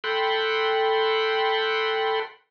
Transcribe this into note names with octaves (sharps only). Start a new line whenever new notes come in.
A4 G5 B5 C6 F#6